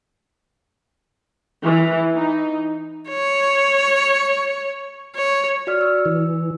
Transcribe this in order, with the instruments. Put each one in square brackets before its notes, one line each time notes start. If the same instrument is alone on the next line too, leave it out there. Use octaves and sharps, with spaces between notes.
[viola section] E3
D#4
[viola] C#5
C#5
[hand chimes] F#4 D5 F6
E6
[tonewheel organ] E3